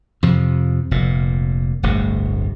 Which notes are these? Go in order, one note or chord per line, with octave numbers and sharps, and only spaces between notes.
F2 C3 F3
F1 A#2
D1 G1 D2 B2